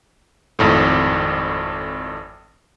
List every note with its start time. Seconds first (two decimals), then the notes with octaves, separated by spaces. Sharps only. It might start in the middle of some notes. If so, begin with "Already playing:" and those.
0.59 G#1 F2 A2